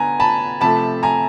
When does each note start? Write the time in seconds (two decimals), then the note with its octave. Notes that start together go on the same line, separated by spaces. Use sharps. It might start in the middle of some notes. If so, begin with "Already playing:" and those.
Already playing: D3 B3 G#5 A#5
0.20 A5 B5
0.61 C3 F3 A3 A5 B5
1.03 G#5 A#5